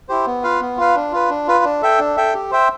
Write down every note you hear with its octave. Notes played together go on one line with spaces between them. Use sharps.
E4 G4 C5
B3
F4 B4 F5
B3
F4 B4 F5
D4
F4 B4
D4
F4 B4
D4
A4 E5 G5
D4
A4 E5 G5
G4
C5 E5 G5